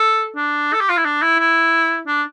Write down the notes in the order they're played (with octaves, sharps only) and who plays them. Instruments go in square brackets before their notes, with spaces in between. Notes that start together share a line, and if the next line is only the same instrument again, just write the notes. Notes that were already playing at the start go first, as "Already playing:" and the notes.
Already playing: [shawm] A4
D4
A4
G4
F4
E4
D4
E4
E4
D4